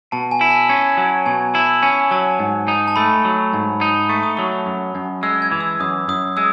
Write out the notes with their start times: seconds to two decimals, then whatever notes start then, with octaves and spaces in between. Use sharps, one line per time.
0.12 B2 A5
0.31 G#5
0.41 E4
0.50 A5
0.69 C#4
0.97 F#3
1.26 B2 G#5
1.54 E4 A5
1.82 C#4 G#5
2.11 F#3 A5
2.39 G#2
2.68 D#4
2.88 A5
2.96 A3 B5
3.25 F#3
3.53 G#2
3.81 D#4
4.09 A3 C#6
4.23 D#6
4.37 F#3 C#6
4.66 F#2
4.95 F#2
5.23 G#3 E6
5.42 G#6
5.52 E3
5.60 E6
5.80 F#2 D#6
6.08 F#2 D#6
6.37 G#3 E6